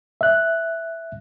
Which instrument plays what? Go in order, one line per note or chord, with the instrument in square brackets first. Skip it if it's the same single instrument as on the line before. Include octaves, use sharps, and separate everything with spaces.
[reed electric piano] E5 F#6